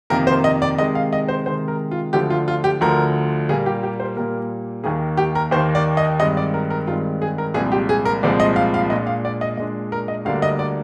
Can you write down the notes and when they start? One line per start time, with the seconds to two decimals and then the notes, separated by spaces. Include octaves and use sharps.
0.10 F2 C3 D#3 A#3 A#4
0.27 C5
0.44 D#5
0.62 D5
0.78 C3 D#3 G#3 D#5
0.95 F5
1.13 D#5
1.28 C5
1.46 C3 D#3 G#3 C5
1.68 A#4
1.91 F4
2.13 D2 D3 F3 G4
2.30 F4
2.48 F4
2.64 G4
2.81 D2 D3 F3 A#4
3.49 A#2 G3 A#3 G#4
3.66 G4
3.83 G4
4.00 C5
4.16 A#2 G3 A#3 A#4
4.84 D#2 D#3 A#3 G#4
5.17 G4
5.35 A#4
5.51 D#2 D#3 A#3 C5
5.75 D5
5.97 D#5
6.20 G2 D#3 G#3 C4 D#5
6.37 D5
6.54 A#4
6.70 A#4
6.87 G2 D#3 G#3 C4 F4
7.22 G#4
7.38 A#4
7.54 C2 A#2 F3 G#3 C4 G#4
7.72 G4
7.89 G#4
8.05 A#4
8.23 C2 A#2 F3 G#3 C4 D5
8.40 D#5
8.56 F5
8.74 F5
8.90 A#2 G#3 D4 D#5
9.07 F5
9.25 D5
9.41 D#5
9.57 A#2 G#3 D4 D#5
9.92 A#4
10.08 D#5
10.25 D2 D3 G3 A#3 D4 F5
10.42 D#5
10.59 D5